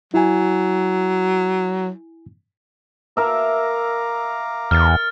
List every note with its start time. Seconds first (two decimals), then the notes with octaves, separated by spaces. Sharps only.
0.14 F#3 E4 G#5
3.17 A#4 E5 F5 A#5 D6
4.71 E2 F6 A6